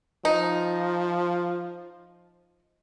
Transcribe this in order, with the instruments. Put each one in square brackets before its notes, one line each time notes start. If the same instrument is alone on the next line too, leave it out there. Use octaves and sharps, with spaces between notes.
[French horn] F3 [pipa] D#4